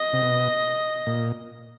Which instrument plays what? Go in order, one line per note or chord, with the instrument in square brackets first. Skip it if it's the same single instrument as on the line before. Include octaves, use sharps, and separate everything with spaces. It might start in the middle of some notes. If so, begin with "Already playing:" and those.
Already playing: [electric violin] D#5
[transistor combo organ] C3
B2
A#2